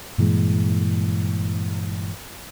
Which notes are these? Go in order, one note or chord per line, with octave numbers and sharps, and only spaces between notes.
G2 A#2 E3 G#3